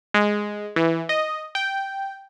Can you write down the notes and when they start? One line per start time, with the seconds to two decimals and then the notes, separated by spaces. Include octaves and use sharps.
0.14 G#3
0.76 E3
1.09 D#5
1.55 G5